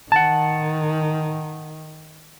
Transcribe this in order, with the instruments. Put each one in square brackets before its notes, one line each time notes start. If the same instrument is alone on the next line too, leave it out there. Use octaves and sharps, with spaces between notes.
[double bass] D#3 [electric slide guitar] F#5 A5